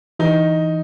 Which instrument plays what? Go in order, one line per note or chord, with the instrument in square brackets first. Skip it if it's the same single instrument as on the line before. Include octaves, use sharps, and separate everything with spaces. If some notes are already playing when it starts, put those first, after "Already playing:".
[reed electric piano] E3 [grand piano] D#4